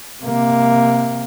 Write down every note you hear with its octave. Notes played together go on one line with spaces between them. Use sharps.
C3 A#3